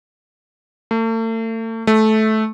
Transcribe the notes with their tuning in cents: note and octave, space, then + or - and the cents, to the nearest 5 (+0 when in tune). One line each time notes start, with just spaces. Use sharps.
A3 +40
A3 -15